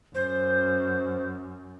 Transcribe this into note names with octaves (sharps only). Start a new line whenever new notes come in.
F#2 C5